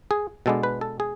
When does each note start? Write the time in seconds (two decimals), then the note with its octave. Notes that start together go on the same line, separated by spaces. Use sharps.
0.11 G#4
0.46 B2 G#3 B3 D4 A4
0.63 B4
0.81 A4
1.00 G#4